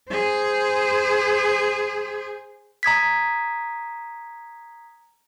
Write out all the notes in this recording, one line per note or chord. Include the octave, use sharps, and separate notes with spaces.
G#4 C5
A#5 D#6 G#6 B6